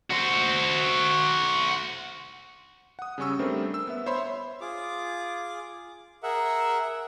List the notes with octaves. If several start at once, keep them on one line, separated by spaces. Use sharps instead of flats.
F#4 C5
F#5 D#6
C#3 G3 C#4 C#6 E6
G3 A3 C4 D4 A#4 C5
E6
B3 E5
C5 C#5 E5 B5 C6
F4 G#4 D6
G#4 A#4 E5 F#5